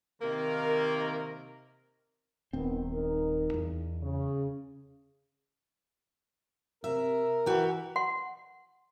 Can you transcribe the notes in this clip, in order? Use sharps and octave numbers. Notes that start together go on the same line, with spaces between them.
C3 D#3 A#3 A#4
D#1 D#3 B3 C4
D#4 A#4
E2
C#3
C3 A#4 E5
E3 F#4 G4
F#5 C6